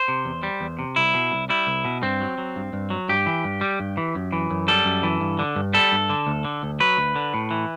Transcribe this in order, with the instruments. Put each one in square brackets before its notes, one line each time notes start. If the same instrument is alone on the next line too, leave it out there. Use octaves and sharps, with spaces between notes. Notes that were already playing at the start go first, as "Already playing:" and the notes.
Already playing: [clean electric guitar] C5
C3
E2
G3
E2
C3
C2 E4
B2
C2
G3 E4
C2
B2
G2 C4
F#3
F#3
G2
G2
F#3
G2 G4
E3
G2
G3
G2
E3
F#2
E3
F#2
G3 A4
F#2
E3
G2
D3
G2
G3 A4
G2
D3
D2
D3
D2
F#3 B4
D2
D3
A2
E3